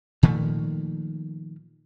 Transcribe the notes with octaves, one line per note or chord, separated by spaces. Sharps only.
A#2 D#3 F3 A3